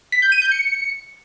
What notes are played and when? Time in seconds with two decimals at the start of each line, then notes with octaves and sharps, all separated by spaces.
0.12 B6
0.22 G6
0.32 D#7
0.42 G6
0.52 C#7